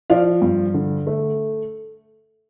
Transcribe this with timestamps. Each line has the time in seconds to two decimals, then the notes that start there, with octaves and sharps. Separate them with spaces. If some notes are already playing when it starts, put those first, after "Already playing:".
0.10 F3 D5 F5
0.42 G2
0.74 D3
1.07 A3